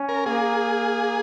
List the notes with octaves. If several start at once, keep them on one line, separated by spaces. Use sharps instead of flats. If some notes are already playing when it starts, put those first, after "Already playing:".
Already playing: C#4
A#4
A#3 G#4